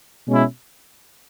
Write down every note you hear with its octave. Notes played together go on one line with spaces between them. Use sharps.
B2 G#3 C#4 E4